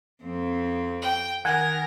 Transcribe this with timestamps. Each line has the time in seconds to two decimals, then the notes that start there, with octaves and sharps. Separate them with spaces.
0.23 F2 C4
1.02 G5
1.45 D#3 A#4 F#5 G#5